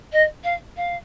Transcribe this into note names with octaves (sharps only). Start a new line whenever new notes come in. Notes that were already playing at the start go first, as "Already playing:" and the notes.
D#5
F5
F5